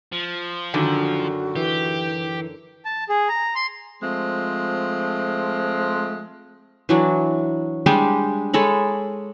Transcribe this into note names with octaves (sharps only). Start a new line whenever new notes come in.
F3
F#2 D3 D#3 F#4
E3 G4
A5
G#4
A#5
C6
F3 G#3 A3 C4
E3 F#3 D4
G3 G#3 D4 G4
G#3 A4 C#5 B5